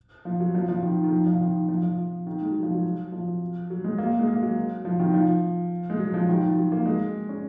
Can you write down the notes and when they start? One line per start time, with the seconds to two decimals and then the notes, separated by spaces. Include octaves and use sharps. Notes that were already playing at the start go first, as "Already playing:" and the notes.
0.25 F3
0.40 F#3
0.55 F3
0.69 F3
0.82 D#3
1.04 D#3
1.12 F3
1.27 F3
1.40 D#3
1.69 F3
1.83 F3
2.26 D#3
2.41 G#3
2.51 F#3
2.63 F3
2.73 F#3
3.12 F3
3.70 F#3
3.84 G#3
3.98 A#3
4.19 G#3
4.27 A#3
4.42 F#3
4.85 F3
4.99 D#3
5.14 F3
5.90 G#3
5.99 F#3
6.14 F3
6.29 D#3
6.43 F3
6.57 F#3
6.72 A#3
6.85 G#3
7.29 C#4